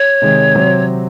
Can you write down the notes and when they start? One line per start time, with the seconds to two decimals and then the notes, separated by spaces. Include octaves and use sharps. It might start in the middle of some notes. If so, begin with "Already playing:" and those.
Already playing: C#5
0.22 C3 D#3 G#3
0.55 C3 F#3 C4